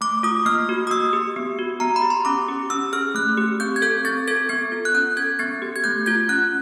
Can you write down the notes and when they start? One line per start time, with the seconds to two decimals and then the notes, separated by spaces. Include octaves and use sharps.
0.01 A3 D6
0.23 F4 D#6
0.46 A#3 F6
0.69 F#4
0.87 D#6
0.91 A#3 E6
1.13 G4
1.36 B3
1.59 F#4
1.80 B3 A#5
1.96 B5
2.02 G4
2.10 C6
2.25 C#4 D6
2.48 G4
2.70 C#4 E6
2.93 G#4 F6
3.15 A3 F#6
3.37 G4
3.60 C4 G6
3.76 G#6
3.82 A4 G6
4.04 C4 A6
4.28 A4 G#6
4.49 B3 G#6
4.72 F4
4.85 F#6
4.94 C#4 G6
5.17 A4 G#6
5.39 B3 A6
5.62 G4
5.76 G#6
5.84 A3 G6
6.06 F4 G#6
6.29 C#4 F#6